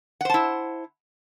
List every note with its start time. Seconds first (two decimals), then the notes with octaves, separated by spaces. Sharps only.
0.21 F#5
0.25 C5
0.30 A5
0.34 E4